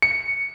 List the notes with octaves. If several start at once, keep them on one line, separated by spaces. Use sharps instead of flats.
C#7